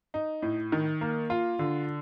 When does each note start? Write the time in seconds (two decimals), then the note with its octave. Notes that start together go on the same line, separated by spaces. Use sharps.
0.14 D#4
0.42 A2
0.72 D#3
1.01 A#3
1.30 F4
1.59 D3